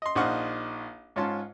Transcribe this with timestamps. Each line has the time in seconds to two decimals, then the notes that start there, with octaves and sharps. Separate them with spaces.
0.02 D#5 C6
0.15 A#1 D#4 C5 F5 F#5 C#6
1.16 G#2 C#4 F4 A5 C6